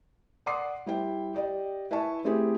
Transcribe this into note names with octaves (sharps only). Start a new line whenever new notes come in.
D5 F#5 C6 D6 D#6 C7
G3 E4 C5 G5
G4 D5 D#5 G5
E4 B4 E5 G#5 A5 C#6
A3 C4 E4 G4 G#4